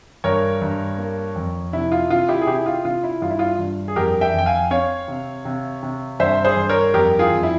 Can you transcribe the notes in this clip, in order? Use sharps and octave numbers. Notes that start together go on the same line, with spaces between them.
G2 A#4 C#5
G2
A#3
F2
C3 E4
F4
C3 F4
E4 G4
G#4
C3 E4 G4
F4
C3 F4
E4
G2 F4
E4
F4
G2
G#4
F2 G4 A#4
E5 G5
F2 G5
F5 G#5
C4 C#5 F5
C3
C3
C3
G2 C5 E5
G#4 C5
G2
A#4 C#5
F2 G4 A#4
F4 G#4
F2
E4